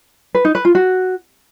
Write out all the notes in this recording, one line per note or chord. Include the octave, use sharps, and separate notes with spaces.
B4
D#4
B4
F4
F#4